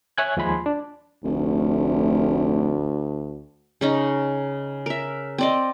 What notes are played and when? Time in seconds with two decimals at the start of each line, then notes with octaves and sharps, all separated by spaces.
0.18 C#5 E5 G#5 F#6 G#6
0.37 D#2 F3 G#3 G#5 B5 C6
0.66 D4
1.24 F1 D2
3.81 C#3 C#4 D#4
4.86 A#4 E5
5.38 C4 D5 D#5